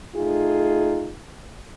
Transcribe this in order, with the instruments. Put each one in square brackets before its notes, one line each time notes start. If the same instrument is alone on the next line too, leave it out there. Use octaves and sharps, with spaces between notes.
[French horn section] A3 D#4 F4 G#4